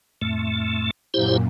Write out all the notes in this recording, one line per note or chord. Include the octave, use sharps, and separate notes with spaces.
F2 A2 A3
F#2 A#2 E4 G4 C5